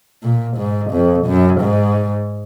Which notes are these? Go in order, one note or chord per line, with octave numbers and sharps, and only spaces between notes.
A#2
G#2
F2
F#2
G#2